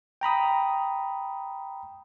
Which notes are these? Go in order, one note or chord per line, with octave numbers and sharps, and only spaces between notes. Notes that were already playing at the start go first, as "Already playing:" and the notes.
G5 A#5 B5 D#6